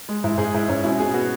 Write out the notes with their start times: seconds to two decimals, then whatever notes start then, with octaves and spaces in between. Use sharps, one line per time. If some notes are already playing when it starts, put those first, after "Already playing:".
0.09 G#3
0.24 G#2 E4
0.38 G#2 G#4
0.54 G#2 E4
0.69 G#2 C#4
0.84 B2 E4
1.00 B2 G#4
1.14 B3 F#4